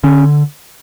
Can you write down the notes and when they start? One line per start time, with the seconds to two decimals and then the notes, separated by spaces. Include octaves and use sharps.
0.04 D3 C#4